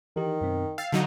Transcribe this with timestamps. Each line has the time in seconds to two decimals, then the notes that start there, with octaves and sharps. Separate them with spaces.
0.16 D#3 E3 D#4 G4
0.41 F#2 B2 C4
0.78 F5 G5 E6 A6
0.92 D3 F#3 D#4